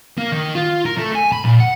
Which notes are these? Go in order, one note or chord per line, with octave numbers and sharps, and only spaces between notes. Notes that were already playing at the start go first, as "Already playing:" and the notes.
A#3
D#3
F4
A#4
A3
G#5
B5
A#2
F#5